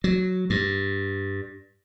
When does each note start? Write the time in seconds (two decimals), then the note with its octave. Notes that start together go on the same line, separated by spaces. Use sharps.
0.04 F#3
0.50 G2